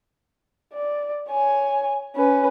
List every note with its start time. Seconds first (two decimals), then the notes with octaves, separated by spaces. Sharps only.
0.73 D5
1.30 C#5 G#5
2.16 C#4 B4